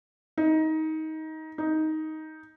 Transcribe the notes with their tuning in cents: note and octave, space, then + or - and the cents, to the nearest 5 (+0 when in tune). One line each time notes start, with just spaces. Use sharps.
D#4 +20
D#4 +10